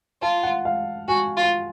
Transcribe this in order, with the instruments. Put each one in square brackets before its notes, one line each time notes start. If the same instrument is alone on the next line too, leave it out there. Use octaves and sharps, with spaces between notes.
[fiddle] F4 [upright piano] A5
[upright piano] F#5
F5
[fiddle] F#4 [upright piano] G#5
[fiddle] F4